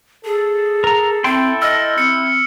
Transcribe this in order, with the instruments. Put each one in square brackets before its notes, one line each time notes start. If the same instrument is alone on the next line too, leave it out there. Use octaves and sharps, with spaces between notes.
[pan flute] G#4 [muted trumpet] A4
[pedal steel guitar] A#4 A#5
[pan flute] C4 [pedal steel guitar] E4 G5 C6
[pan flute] D#5 [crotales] E6 F6
[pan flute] C4 [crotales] C#7